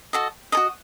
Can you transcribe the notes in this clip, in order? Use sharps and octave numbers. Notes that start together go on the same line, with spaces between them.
F#4 A4 D#5
F#4 A4 D#5 D#6